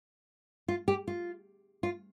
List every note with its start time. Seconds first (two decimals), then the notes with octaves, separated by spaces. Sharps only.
0.68 F4
0.88 G4
1.07 F4
1.83 F4